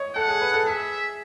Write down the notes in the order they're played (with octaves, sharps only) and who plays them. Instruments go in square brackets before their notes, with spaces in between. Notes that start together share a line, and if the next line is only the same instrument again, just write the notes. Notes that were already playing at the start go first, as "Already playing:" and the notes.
Already playing: [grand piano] C#5 D#5
[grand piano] A4 [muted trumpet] F#5
[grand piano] G#4
B4
A4
[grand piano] G#4 [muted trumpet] E5